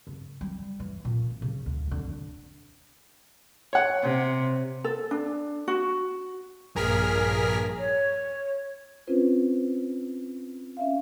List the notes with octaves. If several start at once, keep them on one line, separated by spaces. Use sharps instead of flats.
C#3
G3
E3
A#2
A1
C#3
D2
D3
D4
C#5 F#5
C3
A4
D4
F#4
A#1 G2 G#4 A#4 F6 B6
C#5
C4 C#4 F4 B4 C5
C#4 E5 F5